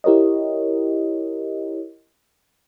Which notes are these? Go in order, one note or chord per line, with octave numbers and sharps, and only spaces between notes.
E4 G4 A#4 C#5 D#5